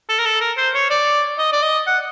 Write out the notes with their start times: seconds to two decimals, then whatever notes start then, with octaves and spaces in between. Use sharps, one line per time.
0.09 A4
0.19 A#4
0.26 A4
0.41 A#4
0.58 C5
0.75 C#5
0.90 D5
1.39 D#5
1.53 D5
1.63 D#5
1.87 F#5